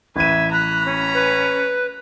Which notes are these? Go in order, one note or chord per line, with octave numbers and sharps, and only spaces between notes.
A1 B4 E5 G#6 D#7
A#5 B5 F#6
C#4
B4